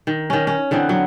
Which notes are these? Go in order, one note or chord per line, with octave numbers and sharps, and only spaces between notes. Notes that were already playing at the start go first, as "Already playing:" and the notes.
D#3
D#3 C#4
C#4
D3 E3 B3 C4
F#3